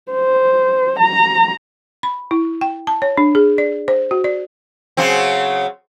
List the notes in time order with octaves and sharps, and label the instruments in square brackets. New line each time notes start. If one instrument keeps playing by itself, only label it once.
[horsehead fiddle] C5
A#5
[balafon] B5
E4
G5
A5
C#5
D4
G#4
D5
C5
F#4
D5
[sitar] C#3 F#3 C4